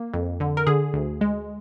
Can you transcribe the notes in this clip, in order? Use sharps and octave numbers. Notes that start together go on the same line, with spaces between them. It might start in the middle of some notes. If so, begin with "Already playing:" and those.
Already playing: A#3
F2
D3
A#4
D3 G#4
D2
G#3